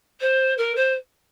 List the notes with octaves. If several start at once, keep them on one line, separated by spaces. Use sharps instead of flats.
C5
A#4
C5